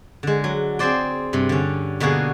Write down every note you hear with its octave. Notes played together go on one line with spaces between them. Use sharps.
D3 G#3
F#3
C4 G#4 C5 D5 G5
G2 C3
D3 C#4
B2 D3 A#3 F#4 G#4